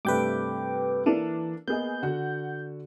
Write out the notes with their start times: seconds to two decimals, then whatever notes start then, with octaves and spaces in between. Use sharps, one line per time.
0.05 G2 C3 A3 B4 G5 D6
1.06 E3 A#3 D4 A4
1.68 A#3 B3 G#4 D#5 G6
2.03 D3 F#4 F#5